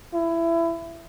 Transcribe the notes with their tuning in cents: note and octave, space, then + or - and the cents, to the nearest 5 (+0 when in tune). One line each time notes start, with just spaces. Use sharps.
E4 +20